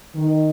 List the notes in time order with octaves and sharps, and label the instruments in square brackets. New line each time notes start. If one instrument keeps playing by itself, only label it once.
[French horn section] D#3